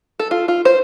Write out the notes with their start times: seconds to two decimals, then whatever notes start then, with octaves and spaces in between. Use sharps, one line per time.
0.20 A4
0.31 F4
0.48 F4
0.65 C5